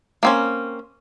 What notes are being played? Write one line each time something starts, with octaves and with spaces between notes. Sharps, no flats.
A#3 C4 C#4